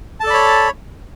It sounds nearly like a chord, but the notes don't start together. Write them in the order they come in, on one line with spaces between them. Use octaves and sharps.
A5 A4 D5 B5 C#5